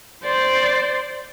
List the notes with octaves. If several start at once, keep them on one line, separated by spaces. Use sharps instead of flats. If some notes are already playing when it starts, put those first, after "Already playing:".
C5 D5